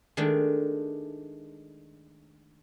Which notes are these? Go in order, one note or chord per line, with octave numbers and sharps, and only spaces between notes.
D#3 G#3 A3 D4